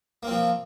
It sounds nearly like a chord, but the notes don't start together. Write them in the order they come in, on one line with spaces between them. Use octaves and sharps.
A#3 C4 F3